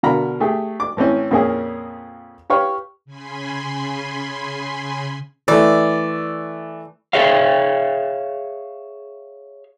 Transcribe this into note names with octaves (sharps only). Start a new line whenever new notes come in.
B2 D3 A#4 F5 A#5 B5
A3 G4 G#4
D6
A2 E3 C4 C#4
F2 A#2 A#3 C#4 G#4
G4 B4 C#5 F5
C#3 G#5 B5 C6
E3 A3 D5
G#4 C#5 E5 F5